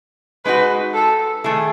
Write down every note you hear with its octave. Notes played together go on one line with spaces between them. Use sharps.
G#3 D#4 F#4 B4
A4
D#3 A3 E4 G#4